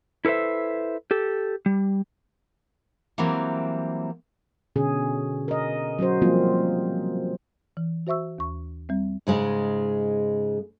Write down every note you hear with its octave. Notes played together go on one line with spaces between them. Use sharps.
E4 A4 B4 C5 E5
G4 A4
G3
E3 F#3 G3 A#3 C4
B2 D3 C#4 G#4
A#4 D#5
F#3 C#4 F#4 C5
F3 G3 A#3 C4 F4
E3
F#4 C5 E5 C#6 E6
D#2 C#6
G3 C4
G#2 C#3 G#3